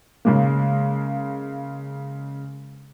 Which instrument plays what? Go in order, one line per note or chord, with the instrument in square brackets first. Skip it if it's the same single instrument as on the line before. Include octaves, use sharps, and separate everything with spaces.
[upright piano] C#3 G#3 A#3